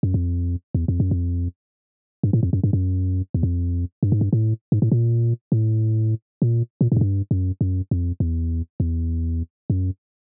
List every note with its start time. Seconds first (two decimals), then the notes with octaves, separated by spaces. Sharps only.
0.03 F#2
0.14 F2
0.75 E2
0.88 F2
1.00 F#2
1.11 F2
2.23 G2
2.33 A2
2.43 F2
2.53 F#2
2.64 G2
2.73 F#2
3.34 E2
3.43 F2
4.03 G2
4.12 G#2
4.21 G2
4.33 A2
4.72 G#2
4.82 A2
4.92 A#2
5.52 A2
6.42 A#2
6.81 A#2
6.92 G#2
6.97 F#2
7.01 G2
7.31 F#2
7.61 F#2
7.91 F2
8.20 E2
8.80 E2
9.70 F#2